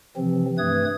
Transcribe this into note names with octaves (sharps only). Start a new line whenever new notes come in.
C3 E3 F3 C4
G2 A3 B4 D#6 G#6